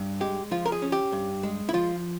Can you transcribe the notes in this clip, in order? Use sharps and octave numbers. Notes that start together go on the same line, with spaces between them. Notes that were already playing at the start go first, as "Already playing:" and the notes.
Already playing: G2
G#3 G4
F3 F4
A#4
G#4
C#4
G4
G2
G#3
E4
F3 F4